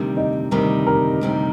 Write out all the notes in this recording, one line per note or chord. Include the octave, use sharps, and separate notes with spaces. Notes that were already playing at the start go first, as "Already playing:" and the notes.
Already playing: D2 C3 D#3 G3
D#4
D2 C3 D#3 G3 A#4
A#4
D2 C3 D#3 G3